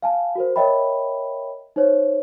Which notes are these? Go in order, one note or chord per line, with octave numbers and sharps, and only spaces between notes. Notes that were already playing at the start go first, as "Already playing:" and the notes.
F5 G#5 A5
F#4 A#4 C5
A#4 C#5 D#5 E5 G5 B5
D#4 C5 C#5